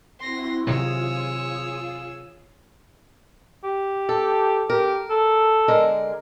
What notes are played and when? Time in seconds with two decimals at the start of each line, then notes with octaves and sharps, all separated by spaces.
0.20 C4 E4 F#4 C6 A#6
0.67 C3 D#3 F#3 F4 G#4 C#5 D#6 E6
3.64 G4
4.09 A4
4.70 G4 A#4
5.10 A4
5.68 D3 G#3 A#4